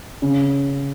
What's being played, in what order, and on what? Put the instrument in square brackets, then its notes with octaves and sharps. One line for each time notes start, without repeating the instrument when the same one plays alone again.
[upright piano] C#3